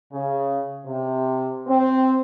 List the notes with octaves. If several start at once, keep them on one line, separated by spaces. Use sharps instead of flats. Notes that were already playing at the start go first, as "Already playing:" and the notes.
C#3
C3
C4